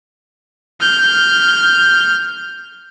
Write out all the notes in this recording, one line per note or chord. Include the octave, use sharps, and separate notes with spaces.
F6 G6